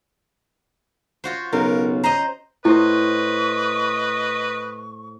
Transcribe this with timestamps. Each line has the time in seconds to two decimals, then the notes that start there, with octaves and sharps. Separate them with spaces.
1.24 F4 F#4 C5
1.53 B1 C#3 A#4
2.03 C5 D#5 A#5
2.65 A2 E4 B4 C5 D#5 C#6